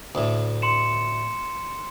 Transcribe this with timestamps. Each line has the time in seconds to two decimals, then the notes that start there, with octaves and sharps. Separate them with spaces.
0.15 D2 A2
0.62 C6 C#7 E7